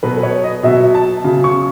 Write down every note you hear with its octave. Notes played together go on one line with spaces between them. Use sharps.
B2 F#3 B4
B4
C#5
D#5
B2 F#3 E5
A5
C#3 F#3
C#6